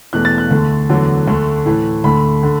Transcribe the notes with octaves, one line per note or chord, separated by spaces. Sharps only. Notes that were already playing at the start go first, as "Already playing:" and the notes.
E2 B2 A3 F#6
A6
F#6
D2 D3 A3
E2 D3 F#3 A3
D2 D3 A3
A2 E3 A3
D2 D3 A3 B5
D3 A3